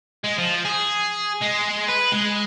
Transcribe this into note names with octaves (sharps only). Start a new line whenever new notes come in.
G#3
F3
G#4
G#3
B4
G#3